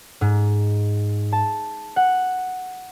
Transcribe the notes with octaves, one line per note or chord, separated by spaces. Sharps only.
G#2
A5
F#5